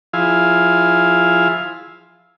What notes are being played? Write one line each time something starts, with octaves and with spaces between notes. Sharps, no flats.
F3 E4 G#4 F5